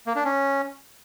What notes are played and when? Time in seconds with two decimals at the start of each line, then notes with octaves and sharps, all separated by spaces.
0.07 A#3
0.16 D4
0.25 C#4